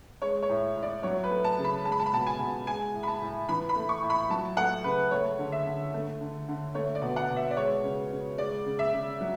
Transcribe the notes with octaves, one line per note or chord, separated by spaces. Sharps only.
G#3 C#5
C#5
A2
A2
D5
F#3 C#5
B4
A3
A5
C#3
B5
G#3 A5
B5
A5
B5
B2 A5
G#5
B2
G#3 G#5
A2
B5
A5
A2
E3 B5
B5
A3
C#6
A2
B5
F#3 A5
A3 F#5
C#3 B4
A3 C#5
D3
E5
D3
A3
D3
D3
A3 C#5
D5
B2
F#5
B2
E5
D5
G#3 C#5
C#3
C#3
G#3 D5
C#3
E5
C#3
F#3